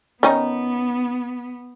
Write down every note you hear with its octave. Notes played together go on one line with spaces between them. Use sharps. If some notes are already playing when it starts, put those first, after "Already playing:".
D#3 B3 C#4 D#4